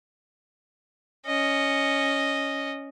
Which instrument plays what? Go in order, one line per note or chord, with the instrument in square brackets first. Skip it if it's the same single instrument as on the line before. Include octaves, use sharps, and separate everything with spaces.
[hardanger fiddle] C#4 D#5